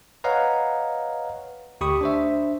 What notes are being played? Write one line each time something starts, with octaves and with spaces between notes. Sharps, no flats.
B4 C#5 D#5 F5 F#5 A#5
D2 G4 B5 C#6 D#6
D4 C5 E5